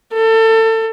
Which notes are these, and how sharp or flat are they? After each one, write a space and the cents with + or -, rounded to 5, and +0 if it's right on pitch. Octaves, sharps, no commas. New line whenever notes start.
A4 +30